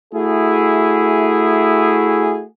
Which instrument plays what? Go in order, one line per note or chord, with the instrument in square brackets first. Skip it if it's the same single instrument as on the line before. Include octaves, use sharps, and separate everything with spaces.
[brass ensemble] A3 E4 F#4 G#4